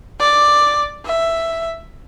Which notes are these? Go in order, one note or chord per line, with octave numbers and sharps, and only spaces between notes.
D5
E5